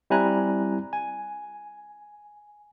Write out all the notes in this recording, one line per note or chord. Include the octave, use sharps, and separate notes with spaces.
G3 C4 E4 G#5 A#5 F#6
G#5